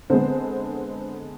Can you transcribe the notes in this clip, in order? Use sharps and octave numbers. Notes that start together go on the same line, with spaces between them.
D3 G#3 B3 C4 C5